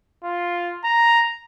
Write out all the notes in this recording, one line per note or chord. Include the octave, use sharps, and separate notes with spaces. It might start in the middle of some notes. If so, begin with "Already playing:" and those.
F4
A#5